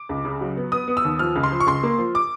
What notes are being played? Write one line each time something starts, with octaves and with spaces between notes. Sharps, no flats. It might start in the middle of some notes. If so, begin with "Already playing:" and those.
Already playing: D6
C#2
C#3
F#3
B3
B3 D#6
B3
E6
D#2
F3 F6
C#2
C6
F3
C#6
C#2 C6
A#3
F3
D6